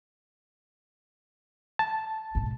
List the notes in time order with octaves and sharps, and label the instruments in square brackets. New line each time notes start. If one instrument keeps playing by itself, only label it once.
[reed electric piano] A5
[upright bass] G#2 B2